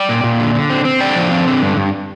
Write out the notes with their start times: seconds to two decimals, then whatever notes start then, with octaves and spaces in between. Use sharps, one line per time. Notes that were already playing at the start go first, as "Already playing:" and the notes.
Already playing: D5 G5
0.09 A#2
0.24 A#2
0.39 D3
0.55 D3
0.70 C4
0.85 C4
1.00 D3 D5 G5
1.16 F3
1.31 C4
1.47 D3
1.62 G2
1.77 G2